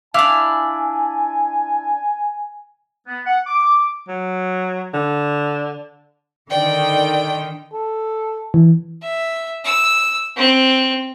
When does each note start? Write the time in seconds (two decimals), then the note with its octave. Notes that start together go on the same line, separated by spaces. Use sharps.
0.14 D4 E4 F5 G#5 D6 F6
3.07 B3
3.26 F#5
3.47 D6
4.08 F#3
4.94 D3
6.50 D3 D#3 D5 G5
7.73 A4
8.54 E3
9.02 E5
9.65 E6
10.36 C4